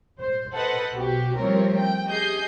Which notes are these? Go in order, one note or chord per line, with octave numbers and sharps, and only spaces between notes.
C5
A4 B4 C5 D#5 F#5
B1 B2 F#4 G4
F3 G3 A3 C4 A#4 C#5
G5
G4 G#4 D#5 G6 C7